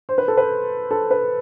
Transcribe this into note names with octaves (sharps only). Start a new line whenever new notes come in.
C5
B4
A4
B4
A4
B4